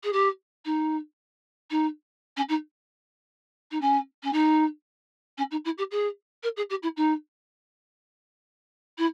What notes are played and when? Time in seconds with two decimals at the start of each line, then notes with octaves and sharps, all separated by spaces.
0.04 G#4
0.13 G4
0.65 D#4
1.71 D#4
2.37 C#4
2.49 D#4
3.71 D#4
3.81 C#4
4.23 C#4
4.33 D#4
5.38 C#4
5.51 D#4
5.65 E4
5.78 G4
5.91 G#4
6.43 A#4
6.57 G#4
6.70 G4
6.83 E4
6.97 D#4
8.98 E4